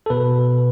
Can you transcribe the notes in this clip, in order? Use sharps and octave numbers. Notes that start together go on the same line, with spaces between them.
A4
B2 B4